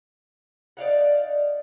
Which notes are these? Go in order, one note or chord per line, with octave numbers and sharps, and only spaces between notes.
D#4 D5 F5 F#5